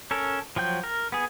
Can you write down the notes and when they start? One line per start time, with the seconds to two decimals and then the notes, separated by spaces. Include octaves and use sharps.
0.11 C#4 A4 A#4
0.56 F3 F#3 G5 G6
0.84 A#4
1.12 B3 G#4